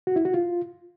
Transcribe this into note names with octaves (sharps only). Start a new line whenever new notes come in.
F#4
E4
F#4
F4